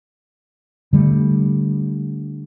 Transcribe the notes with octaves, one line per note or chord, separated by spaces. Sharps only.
D3 G3 A3